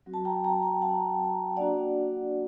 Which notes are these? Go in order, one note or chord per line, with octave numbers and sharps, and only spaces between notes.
F#3 C4 F#4
A5
G5 A#5
G5 A#5
G5 A#5
F#5 A5
A#3 D4 F#4 D5 F#5